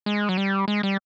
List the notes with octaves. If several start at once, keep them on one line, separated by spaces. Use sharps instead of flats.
G#3
F#3
G3
G#3
G3